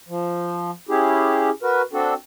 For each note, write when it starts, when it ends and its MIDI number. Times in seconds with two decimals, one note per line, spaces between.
0.08 0.71 53
0.89 1.50 61
0.89 1.50 64
0.89 1.50 67
0.89 1.50 68
1.63 1.82 66
1.63 1.82 70
1.63 1.82 71
1.93 2.14 60
1.93 2.14 62
1.93 2.14 66
1.93 2.14 69